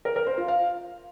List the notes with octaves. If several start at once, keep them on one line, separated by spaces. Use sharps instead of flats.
A#4
A#4
C5
F4
F5